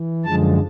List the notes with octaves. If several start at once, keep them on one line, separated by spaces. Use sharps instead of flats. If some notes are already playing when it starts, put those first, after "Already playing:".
Already playing: E3
F#2 D3 F3 G#3 A5